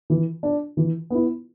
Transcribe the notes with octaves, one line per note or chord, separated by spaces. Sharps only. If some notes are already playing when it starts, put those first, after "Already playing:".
E3
D4
E3
B3 E4